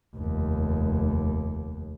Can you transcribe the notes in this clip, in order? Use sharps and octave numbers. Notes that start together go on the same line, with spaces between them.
F1 D#2